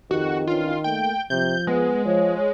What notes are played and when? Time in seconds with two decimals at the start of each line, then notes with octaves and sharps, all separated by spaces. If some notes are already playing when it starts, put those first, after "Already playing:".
0.11 F2 D#3 F#4 G4
0.47 E3 C#4 D4 F4
0.84 A3 A#3 G5
1.30 C3 F3 G6
1.67 G#3 B3
2.06 F3 C#5